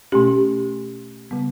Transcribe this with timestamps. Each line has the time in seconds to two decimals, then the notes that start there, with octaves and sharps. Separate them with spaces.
0.12 B2 A3 C#4 G4
1.31 C#3 G3 B3